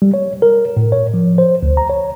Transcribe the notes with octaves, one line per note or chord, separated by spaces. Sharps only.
G3
C#5
A#4
A2
C#5
F3
C5
D2
A#5
C#5